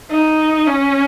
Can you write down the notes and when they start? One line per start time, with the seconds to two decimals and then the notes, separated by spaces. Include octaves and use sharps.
0.11 D#4
0.67 C#4